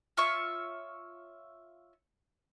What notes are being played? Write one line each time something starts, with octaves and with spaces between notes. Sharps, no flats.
F4 C#5 E5 C#6